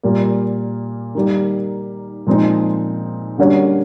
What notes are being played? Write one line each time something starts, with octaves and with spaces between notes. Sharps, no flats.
A#2 G3 A#3
D#3 G3 A#3
A#2 F3 G#3 C4 D#4
D3 G3 A#3 C#4 F#4